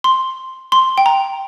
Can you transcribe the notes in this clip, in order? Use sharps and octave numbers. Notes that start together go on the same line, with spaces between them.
C6
C6
G5
A#5